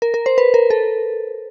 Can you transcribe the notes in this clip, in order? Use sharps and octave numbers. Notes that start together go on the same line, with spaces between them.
A#4
A#4
C5
B4
A#4
A4